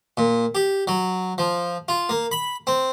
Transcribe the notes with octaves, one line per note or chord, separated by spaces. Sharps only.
A#2
G4
F#3
F3
F4
A#3
B5
C4